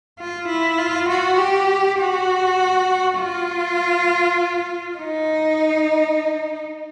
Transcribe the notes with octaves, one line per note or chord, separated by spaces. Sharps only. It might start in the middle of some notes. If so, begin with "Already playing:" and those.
F4
E4
F4
F#4
G4
F#4
F4
D#4